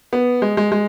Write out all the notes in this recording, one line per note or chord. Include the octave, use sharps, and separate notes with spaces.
B3
G#3
G#3
G#3